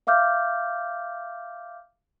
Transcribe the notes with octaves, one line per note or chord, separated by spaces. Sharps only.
E5 F5 D6 F6 G6